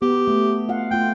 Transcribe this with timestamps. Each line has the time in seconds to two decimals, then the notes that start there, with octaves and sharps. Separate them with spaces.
0.02 B3 G4
0.28 A3
0.69 F4 F5 F#5
0.91 A3 F4 G5